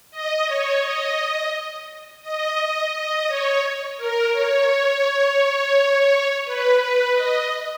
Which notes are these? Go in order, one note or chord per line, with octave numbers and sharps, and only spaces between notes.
D#5
C#5
D#5
D#5
D#5
C#5
A#4
C#5
C#5
B4
B4
D#5